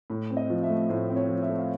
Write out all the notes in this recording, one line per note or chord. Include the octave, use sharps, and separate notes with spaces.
A2
C4
D#5
F3
E5
A3
A2 C5
C4
C#5
F3
E5
A3
F5